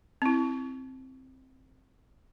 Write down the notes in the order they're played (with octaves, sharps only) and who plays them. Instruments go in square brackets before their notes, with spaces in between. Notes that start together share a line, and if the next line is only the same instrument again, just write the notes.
[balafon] C4 E4